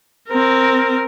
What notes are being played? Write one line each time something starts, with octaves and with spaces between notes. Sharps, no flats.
C4 A#4